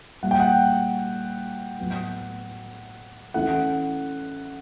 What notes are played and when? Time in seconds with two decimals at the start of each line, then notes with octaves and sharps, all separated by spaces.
0.23 A#2 G3 A#3 F#5
0.31 G5
0.40 F#5
1.78 A2 F#3 B3
3.34 E3 A3 C#4 E4 F#5